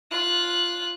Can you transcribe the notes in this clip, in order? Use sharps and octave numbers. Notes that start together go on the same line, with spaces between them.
F4 F#6